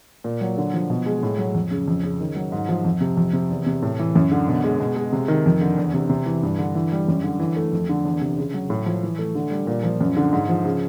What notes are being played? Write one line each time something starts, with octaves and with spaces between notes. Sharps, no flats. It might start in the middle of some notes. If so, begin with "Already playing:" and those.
A#2
F#3
D3
F3
B2
G#3
A2
F#3
F2
C#3
F2
C#3
D#3
F#3
G#2
F3
F2
C3
F2
C3
E2
C3
A2
E3
F#2
D3
B2
G#3
B2
G#3
C3
D#3
F2
D3
E2
C3
C3
E3
G2
D3
E3
G3
F#2
D3
E3
A3
F2
D3
E2
C3
C#3
F#3
A2
F3
E3
A3
D3
G3
A#2
F3
F#2
D3
G#2
F3
C#3